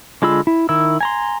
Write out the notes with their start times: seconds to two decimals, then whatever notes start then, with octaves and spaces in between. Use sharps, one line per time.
0.22 D3 G#3 F4 B5 E6
0.47 E4
0.69 D#3 E4 E6
1.01 G#5 A#5 C6